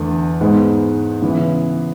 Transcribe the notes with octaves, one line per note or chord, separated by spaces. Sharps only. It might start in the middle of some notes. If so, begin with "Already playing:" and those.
Already playing: E2 D3 A3
G#2 G#3 B3
C#3 E3 B3